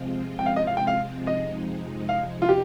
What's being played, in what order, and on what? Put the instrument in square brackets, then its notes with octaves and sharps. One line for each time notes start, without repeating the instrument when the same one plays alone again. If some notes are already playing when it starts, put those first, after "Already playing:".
Already playing: [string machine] C3 F3 G#3 C4 F4
[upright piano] G5
F5
D#5
F5
G5
F5
[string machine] F2 C3 F3 G#3 D#4 [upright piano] D#5
[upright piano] F5
F4
G4